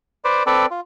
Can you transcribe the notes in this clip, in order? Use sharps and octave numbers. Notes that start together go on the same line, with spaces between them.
B4 C5 D5
C4 A4 B4 D5
F4